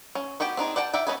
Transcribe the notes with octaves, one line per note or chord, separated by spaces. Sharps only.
C#4
B3 F#4 G4 G5
C4 D4 D#4 G#4
D5 F#5 G5 A5
D5 E5 F#5 G5
B3 C#4 B4 D#5 G#5